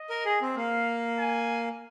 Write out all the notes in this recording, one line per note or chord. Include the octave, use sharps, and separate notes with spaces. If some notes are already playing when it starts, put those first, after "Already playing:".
Already playing: D#5
A#4
G#4
C4
A#3 F5
G#5